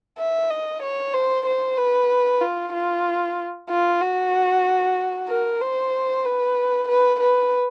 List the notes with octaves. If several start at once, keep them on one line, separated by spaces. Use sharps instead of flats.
E5
D#5
C#5
C5
C5
B4
F4
F4
F4
F#4
A#4
C5
B4
B4
B4